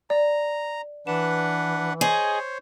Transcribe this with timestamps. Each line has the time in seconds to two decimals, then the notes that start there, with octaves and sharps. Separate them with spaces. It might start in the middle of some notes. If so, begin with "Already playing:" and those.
0.10 D5 A#5
1.07 E3 D4 B4 F#5 E7
2.01 G#4 C5 C#5 D#5